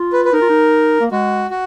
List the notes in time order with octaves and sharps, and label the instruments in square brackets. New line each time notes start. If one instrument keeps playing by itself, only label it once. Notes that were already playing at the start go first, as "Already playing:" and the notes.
Already playing: [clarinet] F4
[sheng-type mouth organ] B4
B4
[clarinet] D#4 [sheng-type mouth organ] A#4
[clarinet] F4
D#4
A#3
[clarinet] G#3 [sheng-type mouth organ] F#4
[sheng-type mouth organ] F#4